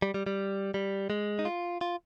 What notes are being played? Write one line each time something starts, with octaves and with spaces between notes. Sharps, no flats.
G3
G3
G3
G3
G#3
D#4
F4
F4